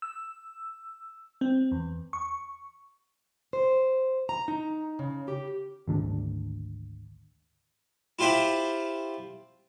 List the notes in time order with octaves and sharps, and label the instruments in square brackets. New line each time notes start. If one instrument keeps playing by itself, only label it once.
[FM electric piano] E6
C4
E2
C#6
[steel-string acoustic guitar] C5
A#5
D#4
C#3
G4
[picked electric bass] G#1 D2 D3
[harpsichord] E4 F4 G4 C5 E5 F#5